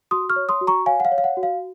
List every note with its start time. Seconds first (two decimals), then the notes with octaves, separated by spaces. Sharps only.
0.11 F#4 C6 D#6
0.30 C#6 F6
0.36 C#5
0.49 C6 D#6
0.61 F#4
0.67 A#5 C#6
0.86 C#5 F5 G#5
1.00 F#5
1.05 F5
1.12 C#5
1.18 F5
1.24 F#5
1.37 F#4
1.43 F5